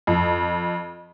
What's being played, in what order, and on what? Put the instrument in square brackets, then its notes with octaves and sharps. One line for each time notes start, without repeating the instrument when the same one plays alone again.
[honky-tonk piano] F2